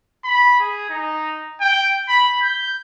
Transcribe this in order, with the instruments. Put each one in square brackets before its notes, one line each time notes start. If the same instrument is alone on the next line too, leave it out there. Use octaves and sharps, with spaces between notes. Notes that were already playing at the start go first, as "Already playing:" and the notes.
[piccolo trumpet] B5
G#4
D#4
G5
B5
G6